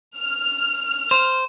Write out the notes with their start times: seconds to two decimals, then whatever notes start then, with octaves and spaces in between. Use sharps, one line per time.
0.18 F6
1.11 C5